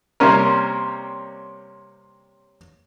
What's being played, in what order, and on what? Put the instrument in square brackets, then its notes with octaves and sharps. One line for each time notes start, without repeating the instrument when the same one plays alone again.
[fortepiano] C3 G3 A#3 C#4 A#4